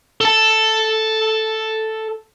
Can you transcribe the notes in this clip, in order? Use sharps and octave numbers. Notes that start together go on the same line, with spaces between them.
A4 A5